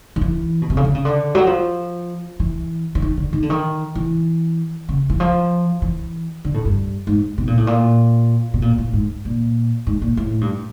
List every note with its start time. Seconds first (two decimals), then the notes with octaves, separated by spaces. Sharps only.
0.16 D#3
0.21 E3
0.62 B2
0.70 C3
0.77 C#3
0.84 D3
0.95 C#3
1.05 D3
1.35 F#3
1.47 F3
2.40 E3
2.95 E3
3.02 D#3
3.17 D3
3.33 D#3
3.42 D3
3.50 D#3
3.95 E3
4.89 C#3
5.10 E3
5.20 F3
5.82 E3
6.45 D3
6.54 A2
6.65 G2
7.07 G#2
7.38 B2
7.47 A#2
7.57 A2
7.67 A#2
8.54 B2
8.62 A#2
8.78 A2
8.93 G#2
9.25 A#2
9.87 G#2
10.02 A#2
10.17 A2
10.41 G2